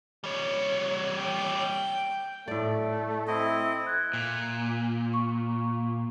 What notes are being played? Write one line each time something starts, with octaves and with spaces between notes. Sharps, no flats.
G3 C#5
G5
A2 A3 D5
C4 E4 D#5
F#6 G#6
A#2
C#6